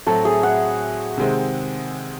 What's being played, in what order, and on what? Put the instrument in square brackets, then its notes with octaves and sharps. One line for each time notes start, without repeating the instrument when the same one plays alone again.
[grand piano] A2 F#3 C4 F#4 [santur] A4
[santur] G#4
F#5
[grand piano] C3 D#3 G#3 C4